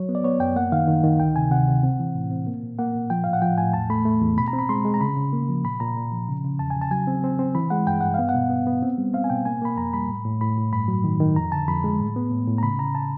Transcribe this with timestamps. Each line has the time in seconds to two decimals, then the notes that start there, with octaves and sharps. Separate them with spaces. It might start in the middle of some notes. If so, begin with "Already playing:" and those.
Already playing: F#3 C#5
0.09 B3
0.15 D5
0.24 B3 C#5
0.40 F#2 G5
0.56 A#3 F#5
0.72 D#3 F5
0.88 D#3
1.04 D#3
1.20 D2 G5
1.36 C3 G#5
1.51 C3 F#5
1.68 C3
1.83 C4
1.99 E3
2.15 A2
2.31 C4
2.47 A#3
2.63 A#2
2.79 A#3 F#5
2.95 A#2
3.10 F3 G5
3.24 A2 F5
3.33 F#5
3.42 F3 G5
3.58 A2 G#5
3.74 E2 A5
3.90 A3 B5
4.05 A3
4.22 E2
4.37 B2 B5
4.48 A#5
4.53 C4
4.59 B5
4.69 G#3 C6
4.85 G#3
4.94 A#5
5.01 C#3 B5
5.16 C#3
5.33 A#3
5.49 F3
5.64 A#2 B5
5.80 A#2 A#5
5.97 A#2
6.12 F3
6.28 C#3
6.44 C#3
6.59 E2 A5
6.70 G#5
6.76 C#3
6.82 A5
6.91 F#3 G#5
7.07 C4
7.24 C4
7.39 C4
7.55 E3 B5
7.70 G#3 F#5
7.87 G2 G5
8.01 G2 F#5
8.14 B3 F5
8.29 F#5
8.35 B2
8.50 B3
8.67 B3
8.82 C4
8.98 G3
9.14 C4 F5
9.24 G#5
9.30 B2 G5
9.46 A#3 G#5
9.62 A#3 B5
9.78 F2 A#5
9.93 G3 B5
10.09 A2
10.25 A2
10.41 A2 B5
10.57 A2
10.72 G2 B5
10.88 F#3
11.04 D#3
11.20 D#3
11.36 F2 A#5
11.52 D3 A5
11.68 F2 B5
11.84 G#3
12.00 A2
12.16 B3
12.32 A2
12.47 A2
12.58 A#5
12.63 C#3 B5
12.79 C#3 A#5
12.95 A5